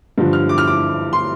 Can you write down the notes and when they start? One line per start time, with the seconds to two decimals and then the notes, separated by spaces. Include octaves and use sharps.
0.18 G2 D3 F3
0.33 F6
0.49 D6
0.58 F6
0.67 D6
1.13 C6